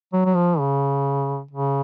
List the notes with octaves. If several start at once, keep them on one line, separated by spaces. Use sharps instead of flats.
F#3
F#3
F3
C#3
C#3